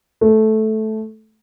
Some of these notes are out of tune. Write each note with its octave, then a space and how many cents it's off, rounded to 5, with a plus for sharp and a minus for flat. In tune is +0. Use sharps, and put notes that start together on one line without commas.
A3 -10